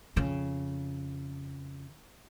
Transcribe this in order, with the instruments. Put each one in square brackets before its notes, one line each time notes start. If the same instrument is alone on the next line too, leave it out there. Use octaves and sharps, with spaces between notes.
[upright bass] F2 C#3